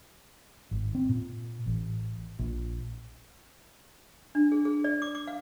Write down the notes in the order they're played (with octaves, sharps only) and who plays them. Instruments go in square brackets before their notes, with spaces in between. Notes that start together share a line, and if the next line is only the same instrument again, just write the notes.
[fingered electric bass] G#1
C4
A#2
A1
A#1
[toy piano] D4
G#4
G#4
D5
D6
D6
F5